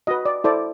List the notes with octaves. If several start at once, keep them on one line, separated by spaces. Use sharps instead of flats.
F#4 B4 D#5
D5
E4 A4 C5 D5